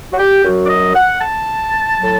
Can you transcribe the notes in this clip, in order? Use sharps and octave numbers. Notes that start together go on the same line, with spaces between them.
F#4
G4
F#2 F#3 F#4
D5
D#5
F#5
A5
A2 F#3